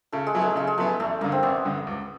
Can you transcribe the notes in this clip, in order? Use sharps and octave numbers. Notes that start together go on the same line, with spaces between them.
C#3 A3
G#3
F#3 B3 E4
A3
C#3 G#3
G#3
F#3 A3 B3 E4
A1 A3
G2 D3 A#3
C4
A1 B3
G2 D3
C#2